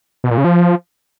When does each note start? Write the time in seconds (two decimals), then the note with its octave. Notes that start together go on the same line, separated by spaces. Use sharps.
0.24 B2
0.31 A#2
0.38 C#3
0.44 F3